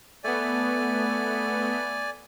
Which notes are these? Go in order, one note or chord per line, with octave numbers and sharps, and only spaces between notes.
A3 B3 D5 G#5